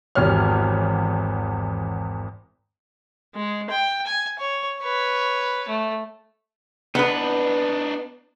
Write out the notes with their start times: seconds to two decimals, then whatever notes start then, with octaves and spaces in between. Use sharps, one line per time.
0.15 G#1 E2 G4 C#5 F6
3.34 G#3
3.70 G5
4.07 G#5
4.39 C#5
4.80 B4 C#5
5.68 A3
6.95 B3 D4 D#4 B4